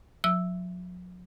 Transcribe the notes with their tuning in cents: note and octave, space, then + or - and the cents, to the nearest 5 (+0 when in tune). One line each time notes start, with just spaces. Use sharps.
F#3 -45 E6 +0